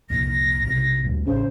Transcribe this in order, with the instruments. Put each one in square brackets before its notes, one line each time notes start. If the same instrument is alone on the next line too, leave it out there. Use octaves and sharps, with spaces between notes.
[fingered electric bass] C2 F2 A#2 [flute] A#6
[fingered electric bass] B1 C3
D2 G2 A#2
[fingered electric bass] A1 C#4 [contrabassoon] C#3 [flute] C5